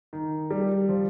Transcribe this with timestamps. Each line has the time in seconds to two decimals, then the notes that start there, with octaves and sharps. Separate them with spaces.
0.13 D#3
0.51 G3
0.89 F3